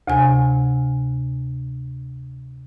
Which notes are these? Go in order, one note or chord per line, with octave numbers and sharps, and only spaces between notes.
D2 C3 G#5